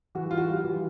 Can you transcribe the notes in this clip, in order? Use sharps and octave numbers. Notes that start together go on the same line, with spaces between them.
E3 F#4
G3 F4
F#4
G3
F4
E3